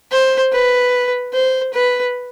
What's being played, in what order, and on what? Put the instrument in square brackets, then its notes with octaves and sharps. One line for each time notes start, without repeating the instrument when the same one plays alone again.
[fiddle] C5
B4
C5
B4